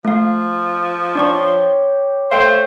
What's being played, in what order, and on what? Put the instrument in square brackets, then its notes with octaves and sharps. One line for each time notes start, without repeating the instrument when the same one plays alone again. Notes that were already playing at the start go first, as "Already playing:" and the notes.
[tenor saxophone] F3 [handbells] A3 F5
[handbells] D4 D5 C#6 [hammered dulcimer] G4 C#5 C6
[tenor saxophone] A3 [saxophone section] C5 [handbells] F5 G5